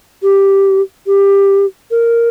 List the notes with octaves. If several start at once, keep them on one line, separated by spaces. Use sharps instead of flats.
G4
G4
A#4